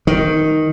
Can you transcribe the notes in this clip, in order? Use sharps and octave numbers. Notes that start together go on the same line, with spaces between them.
D#3